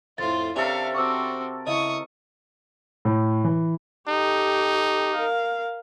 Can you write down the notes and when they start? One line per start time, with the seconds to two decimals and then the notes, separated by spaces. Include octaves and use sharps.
0.18 F2 A2 F4 C5 A6
0.56 C3 C#4 D4 A4 A#4 E5 F5
0.94 C4 F#4 C#6 D6 E6
1.67 C#3 E4 D#5 C#6 D#6
3.05 A2
3.44 E3
4.08 D#4 G4 A4
5.15 A#4 F5